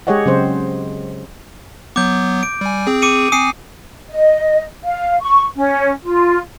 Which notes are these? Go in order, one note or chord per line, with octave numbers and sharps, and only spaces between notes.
G#3 G4 G#4 C#5 D#5 F#5
C#3 F#3 C4 C5
F#3 B3 D6 G6
D7
G3 G#5
C4 G#4
D6 C#7 D#7
C4 G#5 D#6 C7 C#7
D#5
F5
C#6
C#4
F4